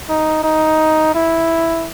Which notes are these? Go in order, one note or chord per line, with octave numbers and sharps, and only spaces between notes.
D#4
D#4
E4